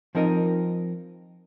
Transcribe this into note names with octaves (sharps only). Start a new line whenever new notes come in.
F3 C4 D#4 A#4 D#5